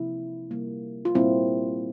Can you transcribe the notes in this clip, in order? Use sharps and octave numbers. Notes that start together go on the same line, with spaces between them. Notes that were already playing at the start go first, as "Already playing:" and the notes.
Already playing: C3 F3 A#3 E4
C3 G3 A#3
F4
A#2 G3 A#3 C4 E4